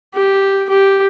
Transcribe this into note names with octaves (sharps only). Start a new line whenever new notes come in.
G4
G4